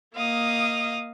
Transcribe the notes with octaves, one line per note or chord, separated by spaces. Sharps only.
A#3 D#5 F5 D#6